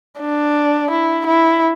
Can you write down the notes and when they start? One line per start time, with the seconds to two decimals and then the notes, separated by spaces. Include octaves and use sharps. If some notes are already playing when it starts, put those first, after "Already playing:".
0.21 D4
0.91 E4
1.26 E4